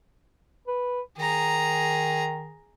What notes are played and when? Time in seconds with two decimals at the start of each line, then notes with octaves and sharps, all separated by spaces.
0.68 B4
1.18 D#3 G#4 A#5